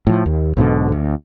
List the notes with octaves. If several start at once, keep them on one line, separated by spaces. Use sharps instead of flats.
A2 F3
D#2
B1 G#2 B2 D3
D2